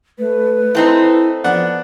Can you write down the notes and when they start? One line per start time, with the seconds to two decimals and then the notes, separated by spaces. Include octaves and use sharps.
0.19 A3 B4
0.75 A3 C4 D#4 E4
1.44 F3 B3 D4 F#5